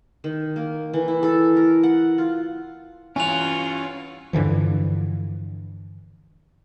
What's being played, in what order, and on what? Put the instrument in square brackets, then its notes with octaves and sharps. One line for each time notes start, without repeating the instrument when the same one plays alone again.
[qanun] D#3
A#3
E3
E4
A4
A#4
F#5
F4
[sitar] G2 E3 [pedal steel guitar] C#4 F#5 [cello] F4 C#5 [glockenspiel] G#5 F7
[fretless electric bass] G2 D3 E3 F3